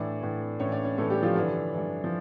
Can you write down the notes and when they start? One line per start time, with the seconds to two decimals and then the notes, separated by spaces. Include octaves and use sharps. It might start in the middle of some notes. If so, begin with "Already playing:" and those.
Already playing: A2 E3 D4 D5
0.21 A2 E3
0.60 A2 C#4 C#5
0.63 E3
0.72 D4 D5
0.85 C#4 C#5
0.98 A2 E3 A3 A4
1.10 G3 G4
1.23 F3 F4
1.36 G2 D3 E3 D4
1.74 G2 E3
2.04 F3